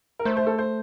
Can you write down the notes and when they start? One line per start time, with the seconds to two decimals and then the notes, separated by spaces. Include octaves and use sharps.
0.19 A#4
0.25 A3 C5
0.37 C5
0.47 A4
0.58 C5